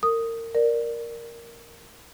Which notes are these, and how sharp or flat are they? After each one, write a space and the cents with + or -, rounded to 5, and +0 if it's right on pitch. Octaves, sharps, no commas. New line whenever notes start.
A#4 -30 D#6 +0
A#4 +0 D5 +10